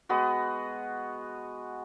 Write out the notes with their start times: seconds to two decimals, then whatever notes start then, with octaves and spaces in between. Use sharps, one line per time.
0.09 G#3 B3 F#4